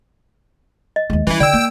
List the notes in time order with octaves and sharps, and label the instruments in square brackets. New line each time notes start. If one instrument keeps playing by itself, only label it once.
[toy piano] D#5
[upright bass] D#2 G#3
[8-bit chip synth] E3 E4 [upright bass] G3 C#4
[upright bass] D3 [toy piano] D5 [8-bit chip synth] G5 E6
[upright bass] A#3